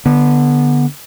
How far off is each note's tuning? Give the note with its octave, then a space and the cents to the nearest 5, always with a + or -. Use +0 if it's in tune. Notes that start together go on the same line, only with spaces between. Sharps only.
D3 +0 B3 -15